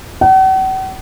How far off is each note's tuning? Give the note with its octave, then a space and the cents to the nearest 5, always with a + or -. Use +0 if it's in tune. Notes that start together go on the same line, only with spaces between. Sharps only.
F#5 +45